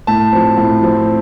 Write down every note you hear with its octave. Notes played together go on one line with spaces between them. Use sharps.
A2 A5
F3 C4
A2
F3 C4